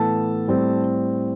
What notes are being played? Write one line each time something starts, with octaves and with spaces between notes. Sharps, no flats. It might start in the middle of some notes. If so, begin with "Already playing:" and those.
Already playing: A2 E3 B3 A4 A5
A2 G3 C4